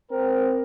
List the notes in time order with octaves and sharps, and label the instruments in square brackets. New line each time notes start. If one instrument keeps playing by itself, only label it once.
[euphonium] C4 [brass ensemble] A#4